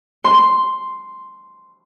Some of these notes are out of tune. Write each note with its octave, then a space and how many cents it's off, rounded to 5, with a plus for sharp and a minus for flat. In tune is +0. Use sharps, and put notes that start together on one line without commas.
C6 +0